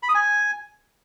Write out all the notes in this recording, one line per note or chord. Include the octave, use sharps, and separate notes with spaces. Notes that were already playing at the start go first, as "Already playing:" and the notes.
B5
D#6
G#5